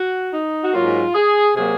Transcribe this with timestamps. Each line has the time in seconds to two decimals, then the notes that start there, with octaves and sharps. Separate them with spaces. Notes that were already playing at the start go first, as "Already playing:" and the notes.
Already playing: F#4
0.33 D#4
0.62 F#4
0.73 G#2 F#3 A#3 F4
1.15 G#4
1.56 C3 F#3 A#3 G#4